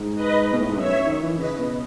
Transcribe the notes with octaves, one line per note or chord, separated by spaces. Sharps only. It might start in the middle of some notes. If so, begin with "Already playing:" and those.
Already playing: G#2
B4 D#5
B2
A2
G#2
F#2 C#5 E5
D#3
E3
C#3 B4 D#5
B2